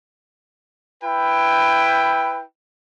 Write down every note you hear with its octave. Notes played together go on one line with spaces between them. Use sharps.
E4 B4 G5